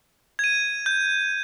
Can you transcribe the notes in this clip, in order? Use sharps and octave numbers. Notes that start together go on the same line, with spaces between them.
G#6 D#7
G6